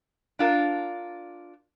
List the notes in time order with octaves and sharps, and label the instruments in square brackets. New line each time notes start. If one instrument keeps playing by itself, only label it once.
[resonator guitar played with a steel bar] D4 F4 A#4